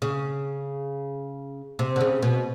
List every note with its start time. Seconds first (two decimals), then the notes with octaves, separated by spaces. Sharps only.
0.02 C#3
1.79 C3
1.96 D3
2.01 C#3
2.22 B2